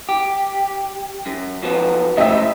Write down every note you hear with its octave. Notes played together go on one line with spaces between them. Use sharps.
G4
F#2
F3 F#3 B3
A2 C#3 G4 D#5 E5